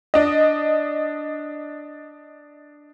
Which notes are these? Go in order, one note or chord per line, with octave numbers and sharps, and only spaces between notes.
D4 D#5